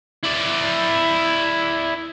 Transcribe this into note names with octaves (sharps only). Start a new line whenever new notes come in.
E4 D5